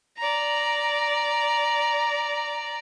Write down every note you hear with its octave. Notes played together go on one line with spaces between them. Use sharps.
D5 A#5